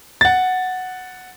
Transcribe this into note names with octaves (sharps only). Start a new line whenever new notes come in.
F#5 A6